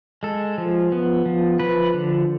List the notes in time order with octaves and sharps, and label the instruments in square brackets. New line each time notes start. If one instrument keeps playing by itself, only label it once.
[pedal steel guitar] G#3 A4
F3
B3
F3
F3 B4
D3